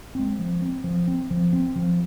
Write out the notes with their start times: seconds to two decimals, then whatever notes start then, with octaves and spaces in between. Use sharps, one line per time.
0.15 G#3 C4
0.39 F3
0.62 C4
0.84 F3
1.08 C4
1.31 F3
1.53 C4
1.76 F3